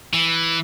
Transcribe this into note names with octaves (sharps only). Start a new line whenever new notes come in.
E3